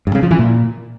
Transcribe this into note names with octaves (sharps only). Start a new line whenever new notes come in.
G2
C#3
F3
E3
A#2